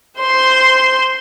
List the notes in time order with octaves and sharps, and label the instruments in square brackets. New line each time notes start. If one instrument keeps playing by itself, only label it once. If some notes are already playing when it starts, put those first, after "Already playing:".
[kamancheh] C5 C6